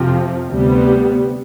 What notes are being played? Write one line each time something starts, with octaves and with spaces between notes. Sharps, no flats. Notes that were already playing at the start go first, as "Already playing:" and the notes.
Already playing: F2 C3 F3
D2 C3 G3 B3